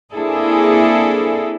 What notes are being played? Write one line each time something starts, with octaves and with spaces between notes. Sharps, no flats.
A#3 C4 D4 E4 G#4 A4